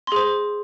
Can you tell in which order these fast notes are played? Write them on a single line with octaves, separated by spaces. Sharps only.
C6 G#4 C5